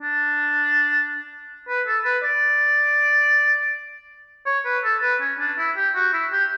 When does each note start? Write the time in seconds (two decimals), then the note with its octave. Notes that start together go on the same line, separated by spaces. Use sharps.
0.02 D4
1.68 B4
1.87 A4
2.05 B4
2.23 D5
4.46 C#5
4.65 B4
4.84 A4
5.02 B4
5.21 C#4
5.39 D4
5.58 E4
5.76 G4
5.95 F#4
6.13 E4
6.32 G4